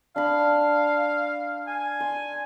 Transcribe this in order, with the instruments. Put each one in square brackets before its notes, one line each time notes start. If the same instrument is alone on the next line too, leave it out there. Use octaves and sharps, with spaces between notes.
[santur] D4 B5 [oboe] F5
[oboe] G#5
[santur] C6